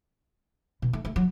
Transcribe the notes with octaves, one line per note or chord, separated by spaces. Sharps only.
B2
A3
A3
F#3